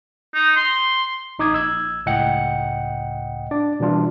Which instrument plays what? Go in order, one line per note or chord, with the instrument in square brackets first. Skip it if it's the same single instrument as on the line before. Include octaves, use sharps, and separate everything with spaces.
[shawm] D#4
C6
[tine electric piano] A1 D#4 D6 D#6 G#6
A#1 E6 G#6
C#2 A2 D#5 F#5 G5 C#7
D4 D5
B2 E3 G3 D4 F4